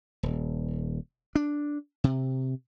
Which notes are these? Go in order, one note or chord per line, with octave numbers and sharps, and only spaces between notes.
D#1
D4
C3